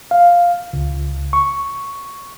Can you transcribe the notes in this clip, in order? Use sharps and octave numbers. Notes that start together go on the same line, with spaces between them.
F5
C#2
C#6